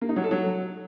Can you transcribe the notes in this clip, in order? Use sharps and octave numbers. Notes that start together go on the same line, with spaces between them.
A#3
D#4
F#3
A4
F#3